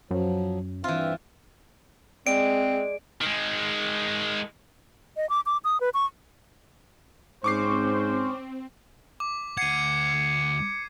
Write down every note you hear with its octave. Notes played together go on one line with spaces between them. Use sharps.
F#2 F3 F#3
G2 E3 C4 F4 E5
G#3 C4 D5 D7
D#3 G#3
D#5
D6
D6
D#6
B4
C#6
G#2 C4 C#4 C5 C#6 D6 C7
D6
D2 F#5 G#6 C7 C#7 D#7